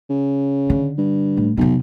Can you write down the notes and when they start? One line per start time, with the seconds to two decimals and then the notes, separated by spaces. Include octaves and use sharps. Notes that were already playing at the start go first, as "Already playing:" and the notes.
0.10 C#3
0.70 D3
0.98 G2
1.37 A2
1.57 B1 F2 C3